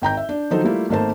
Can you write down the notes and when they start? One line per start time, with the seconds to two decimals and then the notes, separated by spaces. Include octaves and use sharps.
0.02 G#1 G5 A#5 G6
0.17 E5
0.29 D4
0.51 D#3 F3 F#3 D#4 A4 C5
0.64 G3 A3 A#3 E4 F4
0.89 G#1 A3 A#3 C5 A5